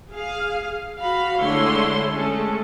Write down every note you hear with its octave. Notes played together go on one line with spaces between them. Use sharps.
G#4 F5
F#4 F5 B5
D3 G#3 A3 E4 C#5 C6
G#3 A3 C#4 A4